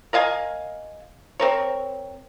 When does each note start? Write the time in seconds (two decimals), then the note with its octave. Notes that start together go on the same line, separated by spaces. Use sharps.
0.13 A#4 D#5 F5 G#5
1.40 C4 A#4 C#5